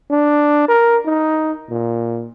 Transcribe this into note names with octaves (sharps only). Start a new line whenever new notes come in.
D4
A#4
D#4
A#2